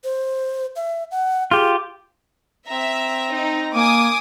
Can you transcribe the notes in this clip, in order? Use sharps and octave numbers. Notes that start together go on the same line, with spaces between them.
C5
E5
F#5
F4 G4 G#4
C4 E5 A#5
D#4
A#3 G#5 D6 D#6